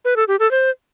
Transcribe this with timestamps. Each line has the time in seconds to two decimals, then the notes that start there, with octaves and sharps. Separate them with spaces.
0.05 B4
0.16 A4
0.28 G4
0.40 A4
0.51 C5